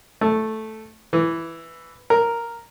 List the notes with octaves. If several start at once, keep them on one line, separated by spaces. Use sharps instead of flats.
A3
E3
A#4